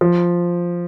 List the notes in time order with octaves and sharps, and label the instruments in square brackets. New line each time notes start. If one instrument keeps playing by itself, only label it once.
[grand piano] F3